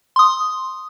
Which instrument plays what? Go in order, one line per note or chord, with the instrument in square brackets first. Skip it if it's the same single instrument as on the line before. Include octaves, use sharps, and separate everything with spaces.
[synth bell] C6 D#6